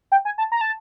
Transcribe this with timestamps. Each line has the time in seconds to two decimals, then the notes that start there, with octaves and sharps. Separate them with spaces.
0.12 G5
0.25 G#5
0.38 A5
0.52 A#5
0.61 A5